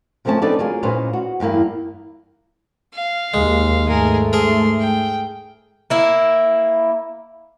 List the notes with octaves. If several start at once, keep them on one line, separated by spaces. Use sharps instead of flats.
F#2 F3 A3 C4 C#4 A5
C4 D4 D#4 A4 B4 D5
F#3 A#3 F4 G#4
A#2 C#4 D#4 B4 C5 F5
F#4
E2 G2 A#3 E4
F5
D#2 G#3
G#2 A3 G#4 A#4
G#4 A#4 C6
G5
A#3 E4